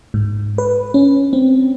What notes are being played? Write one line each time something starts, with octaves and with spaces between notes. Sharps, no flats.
G#2
B4
C#4
C4